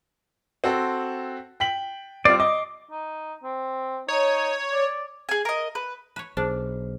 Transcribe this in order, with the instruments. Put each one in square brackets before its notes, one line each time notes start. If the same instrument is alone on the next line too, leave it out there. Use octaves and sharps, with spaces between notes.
[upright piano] C4 F#4 A4
G5 B6 F#7
[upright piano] G3 C4 C7 [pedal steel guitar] F4 D5
[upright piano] D#5 [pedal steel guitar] D6
[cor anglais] D#4
C4
[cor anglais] D#4 [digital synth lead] C#5
[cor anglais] D5
[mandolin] G#4 G#5
A#4 D#5
B4
[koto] B4 C#5
[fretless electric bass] B1 [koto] D4 [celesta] G#4 C5 F6